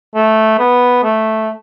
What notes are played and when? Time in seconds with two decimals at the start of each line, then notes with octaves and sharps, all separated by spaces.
0.15 A3
0.59 B3
1.03 A3